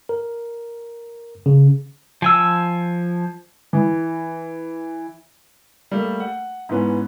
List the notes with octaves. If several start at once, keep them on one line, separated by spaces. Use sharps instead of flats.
A#4
C#3
F3 G#5 E6
E3
G3 A3 A#3
F#5
G#2 E3 B3 C#4